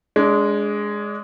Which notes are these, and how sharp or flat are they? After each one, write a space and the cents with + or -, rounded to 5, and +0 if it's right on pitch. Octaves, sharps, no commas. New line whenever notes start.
G#3 +0 D4 -30